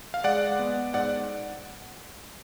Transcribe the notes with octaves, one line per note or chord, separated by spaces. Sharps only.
F5
G#3 D5 F#5
B3
G#2 D5 F#5